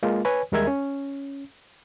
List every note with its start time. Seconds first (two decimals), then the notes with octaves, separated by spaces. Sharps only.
0.03 G#3 A#3 F4
0.25 B4 C#5 G#5
0.52 D#2 G3 G#3 A#4 E5 G#6
0.67 C#4